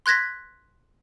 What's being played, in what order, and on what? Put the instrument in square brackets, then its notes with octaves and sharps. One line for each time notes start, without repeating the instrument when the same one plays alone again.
[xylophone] C6 F#6 G#6 A#6 B6